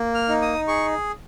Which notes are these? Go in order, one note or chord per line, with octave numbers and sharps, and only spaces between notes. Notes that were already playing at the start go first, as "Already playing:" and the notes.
Already playing: A#3
F6
D#4
D#6
G#4 C#6